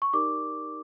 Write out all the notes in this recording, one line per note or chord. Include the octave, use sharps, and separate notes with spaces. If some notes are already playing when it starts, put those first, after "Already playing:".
C#6
D#4 G4 A#4 D5 D6